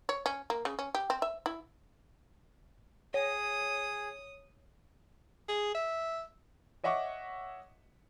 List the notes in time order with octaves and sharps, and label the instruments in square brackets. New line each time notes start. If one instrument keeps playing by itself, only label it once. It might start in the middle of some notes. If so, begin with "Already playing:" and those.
[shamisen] C#5
C#4
A#3
C#3
C#4
G4
C4
E5
E4
[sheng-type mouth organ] G#4 [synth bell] C#5 [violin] D#6
[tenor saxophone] G#4
E5
[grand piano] C#5 D#5 E5 F#5 C#6 D6